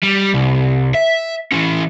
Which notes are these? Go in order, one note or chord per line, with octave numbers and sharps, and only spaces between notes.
G3
C2
E5
E3 C#4